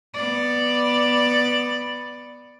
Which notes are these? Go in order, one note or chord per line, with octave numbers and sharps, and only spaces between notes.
B3 D5